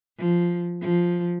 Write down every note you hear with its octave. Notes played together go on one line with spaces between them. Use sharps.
F3
F3